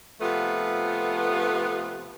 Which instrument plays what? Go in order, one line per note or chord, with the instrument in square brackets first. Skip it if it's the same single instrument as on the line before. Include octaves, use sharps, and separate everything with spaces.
[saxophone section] C3 F3 A3 B3 F4 B4